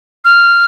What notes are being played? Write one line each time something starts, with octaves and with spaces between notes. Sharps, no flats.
F6